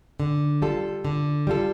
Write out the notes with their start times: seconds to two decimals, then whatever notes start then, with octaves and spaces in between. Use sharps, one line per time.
0.20 D3
0.62 G3 F4 A4
1.05 D3
1.47 G3 F4 A4